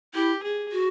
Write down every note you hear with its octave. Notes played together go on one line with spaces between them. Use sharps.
E4 G4
G#4
F#4